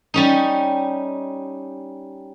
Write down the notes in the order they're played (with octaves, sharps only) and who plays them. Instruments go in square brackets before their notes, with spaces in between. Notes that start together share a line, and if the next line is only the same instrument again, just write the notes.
[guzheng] G3 C#4 D#4